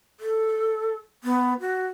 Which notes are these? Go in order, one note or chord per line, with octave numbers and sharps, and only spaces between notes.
A4
B3
F#4